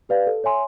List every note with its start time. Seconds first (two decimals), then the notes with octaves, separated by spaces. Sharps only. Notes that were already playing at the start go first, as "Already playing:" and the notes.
0.09 G4 B4 D5 F5
0.27 A4
0.44 C#5 E5 G#5 C6